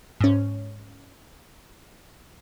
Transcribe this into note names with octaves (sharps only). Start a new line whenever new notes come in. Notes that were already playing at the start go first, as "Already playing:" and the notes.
G#2 C#4